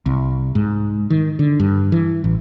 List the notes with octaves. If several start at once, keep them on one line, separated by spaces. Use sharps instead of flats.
C2
G#2
D#3
D3
G2
E3
A1